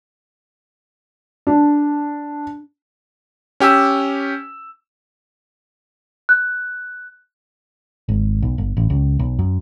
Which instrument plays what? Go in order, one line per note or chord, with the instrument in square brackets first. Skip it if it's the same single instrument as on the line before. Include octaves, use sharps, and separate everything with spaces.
[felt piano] D4
[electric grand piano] C#4 G4 G#5 E6
[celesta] F#6
[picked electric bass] G#1
B1
G1
A1
C#2
B1
F#2